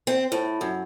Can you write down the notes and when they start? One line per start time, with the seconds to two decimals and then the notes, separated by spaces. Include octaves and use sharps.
0.07 C4
0.32 A2
0.61 F#2